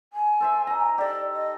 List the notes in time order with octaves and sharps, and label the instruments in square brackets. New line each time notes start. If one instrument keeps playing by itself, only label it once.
[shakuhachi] G#5
[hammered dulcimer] A4 C5 E5
D#4 A#5
[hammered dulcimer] G4 A4 [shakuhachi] D5
[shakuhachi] D#5